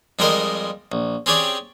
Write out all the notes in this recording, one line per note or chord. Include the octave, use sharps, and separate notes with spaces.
F2 G3 G#3 A#4 C5 D#5
A#1
C4 C#4 G4 G#4 C#5 D5